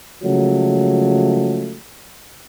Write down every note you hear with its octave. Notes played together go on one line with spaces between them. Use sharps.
C#3 F3 F#3 G#3 A3